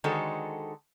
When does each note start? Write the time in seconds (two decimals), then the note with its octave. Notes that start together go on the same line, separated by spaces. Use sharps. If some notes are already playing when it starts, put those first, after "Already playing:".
0.04 D3 D#3 G#3 F#4 A4 C5